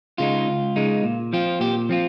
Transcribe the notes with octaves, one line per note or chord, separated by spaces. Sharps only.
C#3 G#3 D#4 F4
C#2
C#3 G#3 D#4
A#2
F3 C4 F4
A#2 G4
F3 C4 F4